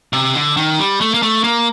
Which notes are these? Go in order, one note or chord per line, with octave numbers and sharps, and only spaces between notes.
C3
D3
D#3
G3
A3
A#3
A3
A#3